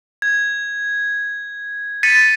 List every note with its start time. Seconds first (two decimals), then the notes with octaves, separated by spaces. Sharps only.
0.22 G#6
2.03 A6 B6 C#7 D#7